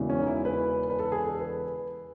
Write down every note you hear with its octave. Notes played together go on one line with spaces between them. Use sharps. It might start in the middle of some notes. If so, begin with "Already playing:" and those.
Already playing: E1 E2 C#3 E3
C#4
D#4
E4
B4
B4
A4
G#4
A4
B4